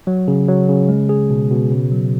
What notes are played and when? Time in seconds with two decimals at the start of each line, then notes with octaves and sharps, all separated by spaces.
0.07 F#3
0.28 C#3
0.48 F#3
0.69 C#3
0.88 G#3
1.09 G#4
1.30 B2
1.51 B2
1.72 C#3
1.92 F#3